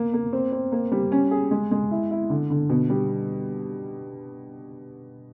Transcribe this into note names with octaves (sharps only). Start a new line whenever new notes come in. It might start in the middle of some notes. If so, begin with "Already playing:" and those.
Already playing: A#3
A#3
C4
C4
A#3
G3
C#4
G#4
G#3
G#3
E4
E4
D3
D3
B2
G3